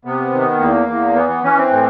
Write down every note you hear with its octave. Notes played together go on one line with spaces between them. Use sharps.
C3 B3
D#3
E2 A#3
E2
E3 B3
B3
E3 C#4
C4
A2